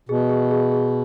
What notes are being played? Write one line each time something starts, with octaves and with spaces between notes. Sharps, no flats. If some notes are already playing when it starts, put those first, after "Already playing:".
B2 G#4
G#4
G#4
G#4